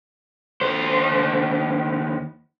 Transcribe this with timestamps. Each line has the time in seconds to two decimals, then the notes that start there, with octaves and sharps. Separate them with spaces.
0.61 D#2 C5